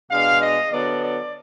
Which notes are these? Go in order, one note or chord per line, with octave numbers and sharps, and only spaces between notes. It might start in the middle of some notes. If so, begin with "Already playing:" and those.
B2 G#3 D4 F5
D#5
D3 F#3 B3 D4 D5
D5